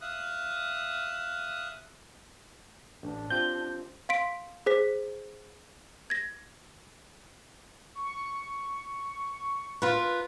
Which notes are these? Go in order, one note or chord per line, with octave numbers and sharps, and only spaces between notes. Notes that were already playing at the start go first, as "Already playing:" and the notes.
E5 F5 D#6 F#6
A1 D4
C4 F4 G4 G6
F5 C6 B6 D7
G#4 C5 B6
G#6 A#6
C#6
F4 A#4 B4